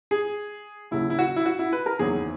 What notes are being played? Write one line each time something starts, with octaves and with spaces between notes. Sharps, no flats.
G#4
D#2 C#3 F#3 E4
E4
F#4
E4
F#4
E4
B4
A#4
F#1 E2 D#3 F#3 G#4